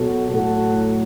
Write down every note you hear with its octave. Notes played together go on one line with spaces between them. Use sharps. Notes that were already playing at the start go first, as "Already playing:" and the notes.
Already playing: B2 F#3 F#4 A4
A2 F#3 F#4 A4